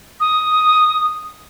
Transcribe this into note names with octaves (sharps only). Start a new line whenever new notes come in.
D#6